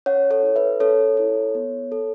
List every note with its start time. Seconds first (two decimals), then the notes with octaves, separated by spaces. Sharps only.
0.06 C#4 C#5 F#5
0.31 A4 C#5
0.43 E4 A4
0.56 B4 E5
0.80 C#4 A4 C#5
1.17 E4 A4
1.55 B3
1.92 A4